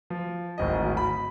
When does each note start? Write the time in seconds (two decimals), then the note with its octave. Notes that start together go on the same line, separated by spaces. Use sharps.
0.10 F3
0.58 D1 G#1 D#5
0.97 B5